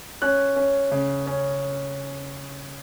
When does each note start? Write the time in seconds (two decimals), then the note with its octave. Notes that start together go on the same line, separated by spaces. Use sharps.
0.22 C#4 F#6
0.56 C#4
0.92 C#3
1.27 C#4